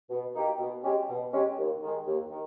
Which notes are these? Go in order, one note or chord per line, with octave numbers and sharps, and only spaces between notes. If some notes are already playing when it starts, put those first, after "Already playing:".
B2
A#3 D#4 G4
B2
G#3 C#4 G4
B2
G#3 C#4 G4
D#2
D#3 G#3
D#2
D#3